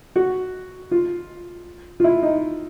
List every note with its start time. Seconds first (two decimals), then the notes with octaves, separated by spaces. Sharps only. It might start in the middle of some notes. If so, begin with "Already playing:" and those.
0.16 F#4
0.91 F4
2.00 F4
2.04 E4
2.22 D#4